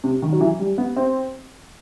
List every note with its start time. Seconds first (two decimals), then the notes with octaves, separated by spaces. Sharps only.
0.04 C3
0.22 D#3
0.32 F#3
0.41 E3
0.59 G3
0.78 B3
0.96 C4